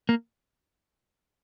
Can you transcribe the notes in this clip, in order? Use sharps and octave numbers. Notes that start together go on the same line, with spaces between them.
A#3